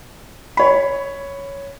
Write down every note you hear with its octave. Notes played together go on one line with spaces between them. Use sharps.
C#5 B5